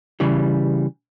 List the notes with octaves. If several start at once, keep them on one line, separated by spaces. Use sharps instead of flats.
C#3 E3 G3